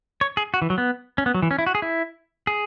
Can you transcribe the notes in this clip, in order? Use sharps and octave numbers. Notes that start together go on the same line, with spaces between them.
C#5
G#4
F#4
E3
F#3
B3
C#4
B3
F#3
E3
C#4
E4
F#4
G#4
E4
G#4